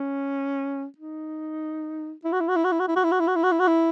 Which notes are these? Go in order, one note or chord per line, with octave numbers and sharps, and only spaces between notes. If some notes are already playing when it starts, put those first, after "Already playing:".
Already playing: C#4
D#4
E4
F#4
E4
F#4
E4
F#4
E4
F#4
E4
F#4
E4
F#4
E4
F#4
E4
F#4
E4
F#4
E4